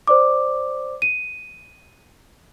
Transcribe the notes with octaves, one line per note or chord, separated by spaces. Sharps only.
C5 D5 D6
D#7